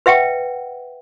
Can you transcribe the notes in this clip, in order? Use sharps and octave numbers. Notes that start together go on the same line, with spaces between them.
B4 E5 F#5 G5